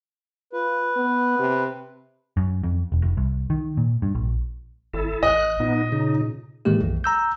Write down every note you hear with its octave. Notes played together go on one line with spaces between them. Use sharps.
F4 B4
B3
C3
F#2
F2
E1
F1
C2
D#3
A#2
G2
A#1
G#1 E4 A4
A1 D#5 F#6
A#2 B3 D#4
C#3 D#4
A2 D#3 E3 G#3 A#3 G4
B1 F#2
A#5 E6 G6